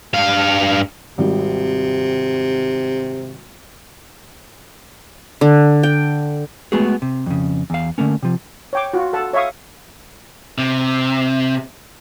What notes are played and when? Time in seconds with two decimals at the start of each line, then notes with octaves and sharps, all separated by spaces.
0.14 G2 F5
1.18 G#1 C3 D#3 G3
5.41 D3
5.83 G5
6.72 G#3 A3 B3 F#4 G#4
7.02 C3
7.26 F2 C#3
7.70 E2 F5
7.98 D3 A3 A#3 C#4
8.23 C3 F3
8.73 C#5 G5 D6
8.93 F4 F#4
9.13 A4 F#5 A5
9.33 C#5 E5 F5 C#6 D#6
10.58 C3